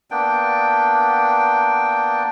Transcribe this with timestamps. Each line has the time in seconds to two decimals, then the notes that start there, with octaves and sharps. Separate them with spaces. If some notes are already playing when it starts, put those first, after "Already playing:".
0.11 A#3 B3 D4 G5